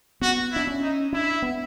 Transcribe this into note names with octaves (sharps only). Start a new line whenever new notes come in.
B3 F#4
D4 E4
C#4
D#4
D4 E4
B3